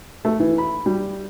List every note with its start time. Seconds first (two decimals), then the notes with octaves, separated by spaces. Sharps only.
0.25 A3
0.40 E3
0.58 B5
0.86 G3